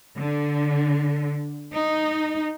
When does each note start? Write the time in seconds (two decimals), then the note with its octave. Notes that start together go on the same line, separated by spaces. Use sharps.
0.17 D3
1.72 D#4